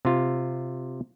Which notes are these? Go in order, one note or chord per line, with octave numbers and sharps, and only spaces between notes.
C3 F4